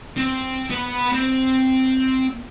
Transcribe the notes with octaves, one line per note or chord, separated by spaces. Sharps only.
C4
B3 B5
C4